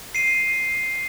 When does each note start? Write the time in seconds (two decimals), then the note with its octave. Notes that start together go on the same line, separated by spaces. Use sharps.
0.15 C7 D#7